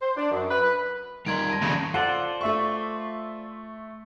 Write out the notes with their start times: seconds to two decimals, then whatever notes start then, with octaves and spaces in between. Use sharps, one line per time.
0.02 C5
0.17 D4
0.31 F#2
0.50 B4
1.26 G3 D#4 A#4 C6 G#6 D7
1.50 A5 A#6
1.62 D#2 C#3 F3 G3 A3
1.94 F4 A4 C5 D5 F#5
2.41 A3 E5 C#6